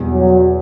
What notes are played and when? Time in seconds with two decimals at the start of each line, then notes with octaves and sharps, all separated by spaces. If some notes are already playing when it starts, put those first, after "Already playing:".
Already playing: E2 B2 G3
0.11 F#3